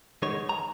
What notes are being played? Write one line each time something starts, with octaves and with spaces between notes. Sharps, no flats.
D#3 G#3 B3 D#4 C#5
A#5